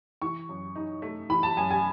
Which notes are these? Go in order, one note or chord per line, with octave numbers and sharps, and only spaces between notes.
E3 C#6
F#2
D#4
A3
E3 B5
A5
F#2 G#5
G#5